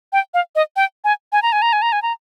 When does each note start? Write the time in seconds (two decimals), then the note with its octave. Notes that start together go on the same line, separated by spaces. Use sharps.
0.13 G5
0.34 F5
0.55 D#5
0.76 G5
1.04 G#5
1.32 G#5
1.42 A#5
1.52 G#5
1.62 A#5
1.73 G#5
1.82 A#5
1.92 G#5
2.02 A#5